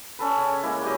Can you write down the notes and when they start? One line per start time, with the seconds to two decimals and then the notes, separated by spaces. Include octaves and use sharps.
0.19 C#4 A4 B4
0.37 C#3
0.63 G#3 A#3 E4
0.82 F#3 G4 B4 D#5